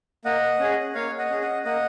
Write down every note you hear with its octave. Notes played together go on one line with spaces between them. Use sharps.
A#3 D#5 F#5
C#4 G#4
A#3 C#5 F5
D#5 F#5
C#4 G#4
D#5 F#5
A#3 D#5 F#5